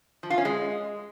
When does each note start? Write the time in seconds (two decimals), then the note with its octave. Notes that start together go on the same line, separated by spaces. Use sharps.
0.23 F3
0.30 F4
0.38 C#4
0.45 G#3